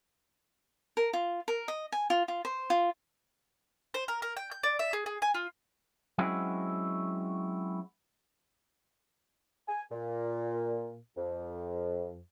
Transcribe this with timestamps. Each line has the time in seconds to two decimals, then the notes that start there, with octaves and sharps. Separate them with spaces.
0.97 A#4
1.13 F4
1.48 A#4
1.68 D#5
1.92 G#5
2.10 F4
2.28 F4
2.45 C5
2.70 F4
3.94 C5
4.08 A#4
4.22 A#4
4.37 G5
4.51 G6
4.63 D5
4.79 E5
4.93 G#4
5.06 G#4
5.22 G#5
5.34 F4
6.18 F#3 G#3 C4 C#4 E4 F#4
9.68 G#5
9.91 A#2
11.17 F2